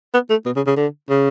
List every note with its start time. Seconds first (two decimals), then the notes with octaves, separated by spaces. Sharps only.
0.14 B3
0.30 A3
0.46 B2
0.56 C#3
0.67 C#3
0.77 D3
1.09 C#3